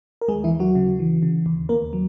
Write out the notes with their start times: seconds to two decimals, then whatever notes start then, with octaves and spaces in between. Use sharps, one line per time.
0.21 A#4
0.28 D#2 G#3 G#4
0.44 E3 E4
0.52 D#2
0.60 F#3 F#4
0.75 C#3
0.99 E3
1.22 C#3
1.46 D#2
1.69 D#2 A#3 A#4
1.93 F#3